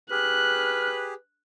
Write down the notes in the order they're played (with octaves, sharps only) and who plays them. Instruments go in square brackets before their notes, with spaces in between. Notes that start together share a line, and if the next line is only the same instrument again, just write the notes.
[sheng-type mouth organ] G4 G#4 [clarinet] B4 [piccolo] F6 [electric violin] F#6